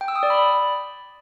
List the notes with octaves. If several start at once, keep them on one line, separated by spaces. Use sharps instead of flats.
G5
E6
D#6
D5
B5